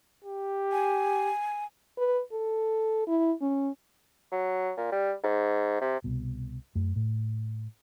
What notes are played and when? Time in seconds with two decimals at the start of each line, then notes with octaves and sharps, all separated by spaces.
0.24 G4
0.72 G#5
1.98 B4
2.32 A4
3.07 E4
3.41 C#4
4.31 F#3
4.77 A#2
4.92 G3
5.23 G#2
5.81 C3
6.04 C2 B2
6.75 F#2 A3
6.96 A2